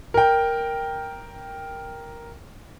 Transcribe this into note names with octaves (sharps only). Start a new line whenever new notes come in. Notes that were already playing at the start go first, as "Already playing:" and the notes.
A#4 G5